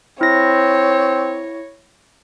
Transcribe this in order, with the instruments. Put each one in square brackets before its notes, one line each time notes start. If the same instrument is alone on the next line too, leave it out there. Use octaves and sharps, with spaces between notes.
[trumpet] C4 [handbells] E4 A#6 [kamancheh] C#5